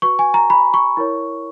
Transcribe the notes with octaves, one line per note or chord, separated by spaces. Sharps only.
F#4 B4 C#6
G#5
A#5
B5
C#6
E4 A#4 C#5